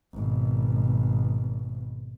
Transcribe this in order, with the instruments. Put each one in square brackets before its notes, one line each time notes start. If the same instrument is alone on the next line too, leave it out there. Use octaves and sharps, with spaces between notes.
[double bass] G#1 B2